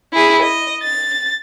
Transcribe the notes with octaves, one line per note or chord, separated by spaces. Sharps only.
E4 G#4
D#5
A6